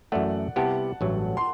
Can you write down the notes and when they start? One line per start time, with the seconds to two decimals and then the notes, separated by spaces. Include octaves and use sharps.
0.12 F#2 E3 A3 D5 F#5
0.56 C3 G3 B3 E4 G4 F#5 A5
1.01 A1 G2 F#3 A3
1.37 C6